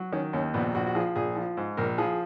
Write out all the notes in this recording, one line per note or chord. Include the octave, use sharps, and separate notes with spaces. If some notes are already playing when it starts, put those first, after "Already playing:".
Already playing: F#3
D#3 C#4
D#2 C#4
A#1 B3
A#1 F#4
F#4
F3 G#4
A#1 G#4
F3
G#2
A#1 A#4
F3 G#4